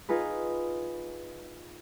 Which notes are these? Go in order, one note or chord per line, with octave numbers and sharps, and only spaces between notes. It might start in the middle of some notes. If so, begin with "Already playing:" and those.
D#4 F4 G#4 B4